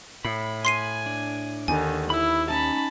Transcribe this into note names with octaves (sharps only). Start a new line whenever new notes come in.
A2 B5
G#5 C6 C7 D#7
D4
D#2 D3 D#3 G#5
E4 B5 E6
C#4 D#4 A5 B5